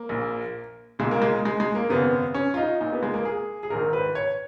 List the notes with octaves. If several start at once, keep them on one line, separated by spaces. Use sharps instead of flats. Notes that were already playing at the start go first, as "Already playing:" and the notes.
Already playing: A#3
A#1 A#2
B1 A#2 G#3
A#3
G#3
G#3
G#3
A#3
G#1 F#2 C#3 B3
C#4
F4
D#4
A#1 A#2 D#4
B3
G#3
A#3
G#4
G#4
A#1 G#2 D#3 A#4
B4
C#5